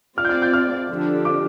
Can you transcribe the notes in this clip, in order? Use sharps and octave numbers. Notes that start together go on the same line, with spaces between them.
C4 F4 D5 F6
G6
F6
G6
F6
D3 F3 D4 G4
D6